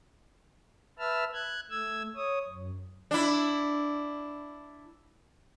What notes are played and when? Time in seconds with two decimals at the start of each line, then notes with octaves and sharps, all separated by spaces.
0.99 B4 E5 A5 E6 F6
1.34 F#6 G#6
1.70 A3 E6 G#6
2.16 C#5 D#6
2.49 F#2
3.11 D4 E4